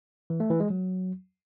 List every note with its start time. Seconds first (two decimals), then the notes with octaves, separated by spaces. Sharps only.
0.30 E3
0.40 A3
0.50 E3
0.60 G#3
0.70 F#3